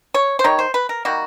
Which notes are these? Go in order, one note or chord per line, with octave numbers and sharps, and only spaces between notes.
C#5
C5
D#3 G3 C#5
C5
B4
A#4
D#3 G3 A#3 F#4